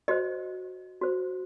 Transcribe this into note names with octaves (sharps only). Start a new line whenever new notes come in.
F#4 C5 D#5
F#4 C5